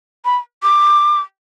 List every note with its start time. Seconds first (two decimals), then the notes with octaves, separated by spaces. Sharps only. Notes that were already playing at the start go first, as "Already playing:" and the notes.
0.25 B5
0.63 D6